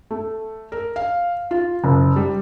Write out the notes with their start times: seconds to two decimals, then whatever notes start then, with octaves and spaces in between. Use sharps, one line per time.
0.11 A3
0.72 A#4
0.96 F5
1.51 F4
1.84 F#1
2.16 G3